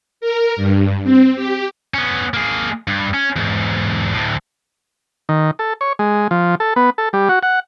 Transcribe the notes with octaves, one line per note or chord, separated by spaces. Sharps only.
A#4
G2
C4
G4
B3 C#4
A#3 G#4
G2
C#4
E2 G#2
D2 A2
D#3
A4
C#5
G#3
F3
A4
B3
A4
G3
F#4
F#5